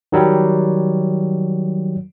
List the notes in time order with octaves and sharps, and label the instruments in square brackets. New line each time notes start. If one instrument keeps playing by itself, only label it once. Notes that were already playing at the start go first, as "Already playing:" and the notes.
[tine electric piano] D#3 F#3 G3